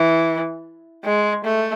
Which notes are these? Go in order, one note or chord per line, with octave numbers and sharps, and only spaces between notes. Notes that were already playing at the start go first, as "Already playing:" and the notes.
Already playing: E3
G#3
A3